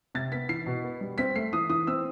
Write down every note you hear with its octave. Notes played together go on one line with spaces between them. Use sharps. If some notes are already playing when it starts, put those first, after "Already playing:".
C3 A6
B3 B6
E3 C7
B2
B3
G3
C4 B6
A3 C7
E3 D#6
E3 D#6
C4 E6